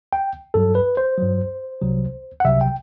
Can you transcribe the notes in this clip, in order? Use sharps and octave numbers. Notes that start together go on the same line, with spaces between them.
G5
G2 F#3 A4
B4
C5
G2 F#3
C2 C3 F#3
F#5
C2 C3 F#3 E5
G5